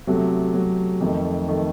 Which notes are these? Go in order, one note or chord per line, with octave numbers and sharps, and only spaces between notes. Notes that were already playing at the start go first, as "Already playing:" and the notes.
C3 F#3 A3
C3 F#3 A3
F2 D#3 A3
D#3 A3